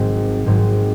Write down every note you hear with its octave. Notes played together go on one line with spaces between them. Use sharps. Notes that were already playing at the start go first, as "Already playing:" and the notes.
Already playing: G#1 G#2 F#3 C4
G#1 G#2 F#3 C4